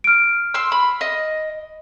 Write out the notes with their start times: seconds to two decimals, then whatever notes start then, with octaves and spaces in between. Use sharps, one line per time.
0.04 F6 D7
0.54 C6 E6
0.72 B5
1.01 D#5